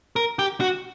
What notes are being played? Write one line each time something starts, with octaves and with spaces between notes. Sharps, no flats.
A#4
G4
F#4